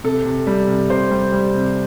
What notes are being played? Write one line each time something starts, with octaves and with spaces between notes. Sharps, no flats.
C3 A4
C3
G3
C3
C3 C5
G3
G3
C3